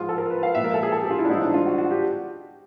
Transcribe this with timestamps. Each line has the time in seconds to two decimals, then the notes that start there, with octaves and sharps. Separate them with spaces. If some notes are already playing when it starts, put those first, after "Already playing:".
Already playing: G#2 F3 G#3 F4
0.09 A4
0.18 A#4
0.30 B4
0.43 F5
0.55 A#2 F3 G#3 E5
0.64 A#4
0.74 A4
0.83 G#4
0.92 A4
1.01 G4
1.10 F4
1.19 E4
1.25 D4
1.29 G#2 E3 G3 D#4
1.41 D4
1.54 F4
1.66 F#4
1.78 F#4
1.91 G4